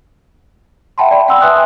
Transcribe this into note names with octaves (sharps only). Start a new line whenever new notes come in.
E5 F#5 G5 A5 B5 C6
D5 G5 B5
F#5 G5 A5 B5 C6 E6
B4 E5 G#5 C6 D#6 F#6